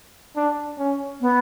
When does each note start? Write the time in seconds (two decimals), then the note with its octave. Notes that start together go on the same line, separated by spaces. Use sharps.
0.36 D4
0.78 C#4
1.21 B3